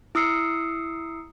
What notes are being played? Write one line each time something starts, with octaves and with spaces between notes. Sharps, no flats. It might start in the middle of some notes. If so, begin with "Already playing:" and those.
E4 D#6 E6 C7 C#7